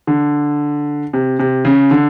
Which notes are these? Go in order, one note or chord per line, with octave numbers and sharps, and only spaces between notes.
D3
C3
C3
C#3
D3